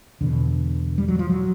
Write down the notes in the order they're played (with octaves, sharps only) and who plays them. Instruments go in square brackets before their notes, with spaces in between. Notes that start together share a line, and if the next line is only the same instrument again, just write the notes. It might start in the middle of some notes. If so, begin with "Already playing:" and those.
[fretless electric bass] E2 B2 D3
G3
F#3
F3
F#3